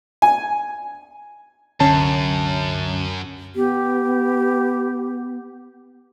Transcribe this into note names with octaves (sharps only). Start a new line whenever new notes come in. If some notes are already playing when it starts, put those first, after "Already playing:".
G#5
C2 F#2 D3 C#4 A5
B3 G4